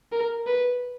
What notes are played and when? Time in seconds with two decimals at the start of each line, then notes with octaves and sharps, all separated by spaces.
0.12 A#4
0.47 B4